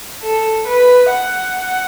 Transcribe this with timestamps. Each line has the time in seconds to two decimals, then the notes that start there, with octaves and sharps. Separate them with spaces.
0.23 A4
0.67 B4
1.11 F#5